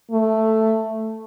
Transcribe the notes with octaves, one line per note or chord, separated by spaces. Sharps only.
A3